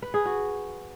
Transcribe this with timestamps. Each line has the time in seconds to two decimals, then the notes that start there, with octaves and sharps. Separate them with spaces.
0.02 B4
0.14 G#4
0.25 F#4